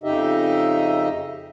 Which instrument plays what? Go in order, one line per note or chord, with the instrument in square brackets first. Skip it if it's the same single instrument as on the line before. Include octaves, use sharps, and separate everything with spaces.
[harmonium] F2 C#3 D#4 G4 D#5 E5